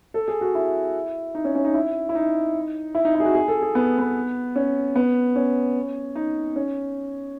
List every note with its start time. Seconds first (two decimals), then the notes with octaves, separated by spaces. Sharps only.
0.14 A4
0.28 G#4
0.41 F#4
0.55 E4
1.35 D#4
1.45 C#4
1.55 C#4
1.65 D#4
1.74 E4
2.09 E4
2.15 D#4
2.95 E4
3.05 D#4
3.15 E4
3.20 G#4
3.25 F#4
3.35 G#4
3.48 A4
3.62 G#4
3.75 B3
3.98 B3
4.56 C#4
4.96 B3
5.36 C#4
6.16 D#4
6.56 C#4